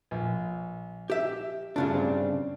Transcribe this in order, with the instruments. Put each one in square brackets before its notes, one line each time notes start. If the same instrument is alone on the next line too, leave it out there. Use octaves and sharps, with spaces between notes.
[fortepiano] A#1
[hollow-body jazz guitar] G4 E5
[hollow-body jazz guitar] G2 C#3 D4 [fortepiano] A3 E4 F4
[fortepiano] C4